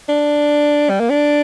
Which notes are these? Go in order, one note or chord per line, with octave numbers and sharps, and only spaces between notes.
D4
G3
A#3
D4